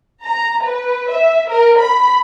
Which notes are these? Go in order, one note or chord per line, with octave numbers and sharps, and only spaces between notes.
A#5
B4
E5
A#4
B5